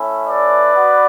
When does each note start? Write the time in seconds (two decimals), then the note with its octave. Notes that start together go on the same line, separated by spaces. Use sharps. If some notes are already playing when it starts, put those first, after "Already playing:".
Already playing: A3 C#4 E4
0.27 B4 D5
0.75 B3 F#4